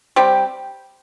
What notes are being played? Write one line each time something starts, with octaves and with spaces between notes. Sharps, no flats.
G3 C4 G4